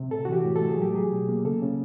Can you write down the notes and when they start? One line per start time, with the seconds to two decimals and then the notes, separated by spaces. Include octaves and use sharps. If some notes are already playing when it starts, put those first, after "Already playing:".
Already playing: C3
0.11 A2 A4
0.25 F#4
0.28 E3 G4
0.44 A2
0.56 A4
0.61 A3
0.69 G#4
0.78 F#3 G4
0.94 F#3 G#4
1.12 B2
1.29 A#3
1.45 C#3 A4
1.62 C#3